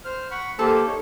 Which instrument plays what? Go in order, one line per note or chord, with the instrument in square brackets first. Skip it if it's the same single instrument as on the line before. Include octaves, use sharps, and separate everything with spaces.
[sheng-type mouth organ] C5 F6
F#5 B5 C#6
[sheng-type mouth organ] A#3 G4 C5 [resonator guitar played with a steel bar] A4
[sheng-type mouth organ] D#4 C#5